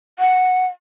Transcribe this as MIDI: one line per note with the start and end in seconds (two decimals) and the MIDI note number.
0.19 0.66 78